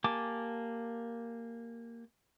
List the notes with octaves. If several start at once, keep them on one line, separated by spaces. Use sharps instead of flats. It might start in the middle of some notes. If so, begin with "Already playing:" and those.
A#3 G4 G#5 A5 D6